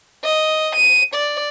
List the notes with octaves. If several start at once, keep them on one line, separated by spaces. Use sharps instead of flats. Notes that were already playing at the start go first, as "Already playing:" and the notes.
D#5
D#7
D5